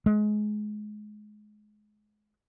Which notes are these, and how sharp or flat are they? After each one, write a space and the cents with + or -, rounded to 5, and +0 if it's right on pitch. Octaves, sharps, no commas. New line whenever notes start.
G#3 +25